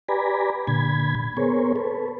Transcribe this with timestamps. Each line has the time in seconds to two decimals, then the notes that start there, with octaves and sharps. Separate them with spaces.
0.08 G4 B4 D5 G#5 A#5 B5
0.67 A#2 D3 B5 G#6
1.37 B3 G#4 A#4 C5 C#5
1.76 A4 B4